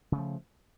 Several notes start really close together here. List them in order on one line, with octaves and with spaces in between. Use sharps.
C#3 A3 F3